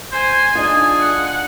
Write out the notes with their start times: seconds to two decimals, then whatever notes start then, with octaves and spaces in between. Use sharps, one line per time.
0.12 C5 G#5
0.55 D4 D#4 F4 G#4
1.00 F#5